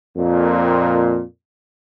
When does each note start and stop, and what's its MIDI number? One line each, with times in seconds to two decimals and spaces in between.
0.17 1.22 41
0.17 1.22 46